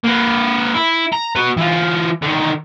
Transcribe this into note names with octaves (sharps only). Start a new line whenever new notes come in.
A#3 B4
E4
A#5
F#4 B4
E3 F4
D3 D#3